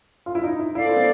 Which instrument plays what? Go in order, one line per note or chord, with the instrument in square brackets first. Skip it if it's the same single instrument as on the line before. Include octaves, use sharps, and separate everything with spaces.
[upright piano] F4
E4
D#4
E4
[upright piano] E4 [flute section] A4 D5 F5
[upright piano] C4
B3